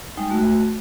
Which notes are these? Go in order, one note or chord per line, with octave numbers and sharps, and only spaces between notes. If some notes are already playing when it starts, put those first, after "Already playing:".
G3 G#3 D#4
A3 F#4